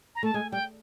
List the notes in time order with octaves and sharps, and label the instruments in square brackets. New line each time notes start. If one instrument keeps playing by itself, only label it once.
[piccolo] A#5
[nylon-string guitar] A3 [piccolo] A5
[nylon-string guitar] G#3 [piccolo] G#5
[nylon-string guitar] G3 [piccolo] G5